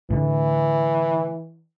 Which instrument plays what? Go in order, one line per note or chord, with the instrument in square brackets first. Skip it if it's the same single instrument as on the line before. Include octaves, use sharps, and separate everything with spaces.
[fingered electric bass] A2 D3 [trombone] E3